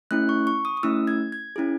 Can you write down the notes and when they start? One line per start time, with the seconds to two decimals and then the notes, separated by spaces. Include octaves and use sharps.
0.11 A3 C#4 E4 F#6
0.29 C#6
0.47 C#6
0.65 D#6
0.77 D#6
0.83 A3 C#4 E4 E6
1.07 G#6
1.32 G#6
1.56 C#4 E4 G#4